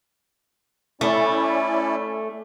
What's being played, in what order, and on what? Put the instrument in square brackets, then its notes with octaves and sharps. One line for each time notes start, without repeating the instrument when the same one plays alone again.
[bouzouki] A3 [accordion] C#4 E4 D5